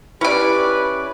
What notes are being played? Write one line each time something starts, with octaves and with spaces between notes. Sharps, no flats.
C#4 E4 G4 B4 D5